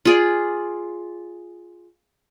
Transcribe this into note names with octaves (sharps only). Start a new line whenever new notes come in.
F4 G#4 D5